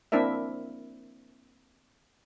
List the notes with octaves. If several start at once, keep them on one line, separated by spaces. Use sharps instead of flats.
A#3 C4 D4 E4 A#4 E5